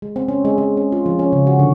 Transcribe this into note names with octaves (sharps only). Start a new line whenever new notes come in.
G#3
C4
C#4
G#3
G#3
C#4
F4
F3
C#4
C#3
F#4
D3